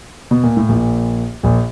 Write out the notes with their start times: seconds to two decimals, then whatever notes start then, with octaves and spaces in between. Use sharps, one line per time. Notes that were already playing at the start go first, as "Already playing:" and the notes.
0.31 B2
0.43 A#2
0.57 A2
0.69 A#1 A#2
1.43 A#1 A#2